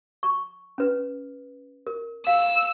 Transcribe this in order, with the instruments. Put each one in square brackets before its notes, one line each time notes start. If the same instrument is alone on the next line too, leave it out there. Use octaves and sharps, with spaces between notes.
[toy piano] C#6
C#4 B4
A#4
[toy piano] F5 [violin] E6